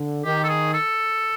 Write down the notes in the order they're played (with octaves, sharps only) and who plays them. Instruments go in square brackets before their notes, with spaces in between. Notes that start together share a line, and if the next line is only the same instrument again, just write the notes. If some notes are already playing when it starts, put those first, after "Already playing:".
Already playing: [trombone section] D3
[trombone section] D#3 [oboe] G4
[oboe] A4
G#4
A4